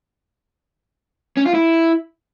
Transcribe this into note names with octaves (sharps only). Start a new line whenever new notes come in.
C#4
F4
E4